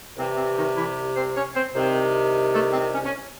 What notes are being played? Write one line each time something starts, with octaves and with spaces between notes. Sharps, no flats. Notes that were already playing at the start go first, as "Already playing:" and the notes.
C2 C3 E3 C4
C4
D#3 D#4
E3 E4
C4 C5
C#4 C#5
C4 C5
C2 C3 D#3 C4 C5
A3 A4
C4
C#4
C#4